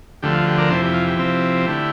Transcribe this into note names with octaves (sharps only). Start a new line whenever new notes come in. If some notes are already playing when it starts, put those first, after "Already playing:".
D2 D3 F3 A3 G4
F4
G4
A#4 D5
F2 C3 E3 A4 C5
G4
F4
G4
C3 F3 C4 E4
D3 A3 E4